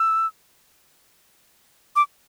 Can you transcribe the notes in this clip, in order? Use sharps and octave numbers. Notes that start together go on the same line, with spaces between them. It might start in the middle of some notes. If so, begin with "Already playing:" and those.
Already playing: E6
D6